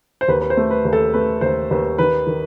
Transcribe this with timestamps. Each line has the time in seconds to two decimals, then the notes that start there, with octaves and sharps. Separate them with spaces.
0.21 C5
0.28 D#2 B4
0.41 B4
0.50 C5
0.57 A3
0.71 B4
0.85 D#2
0.93 A4
1.13 A3 B4
1.41 D#2 C5
1.71 D#2 B4
1.98 D#3 B4
2.27 D#3